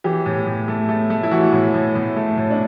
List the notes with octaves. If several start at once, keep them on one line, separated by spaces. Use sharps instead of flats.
E3 G4
A2
A2
A3
A3
A3
E4
E3 F#4
A2
A2
A2
A3
A2
D4